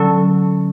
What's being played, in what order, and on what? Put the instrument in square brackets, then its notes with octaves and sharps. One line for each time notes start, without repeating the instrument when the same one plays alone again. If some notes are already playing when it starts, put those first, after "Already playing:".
Already playing: [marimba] D3 F#3 C#4 [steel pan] A4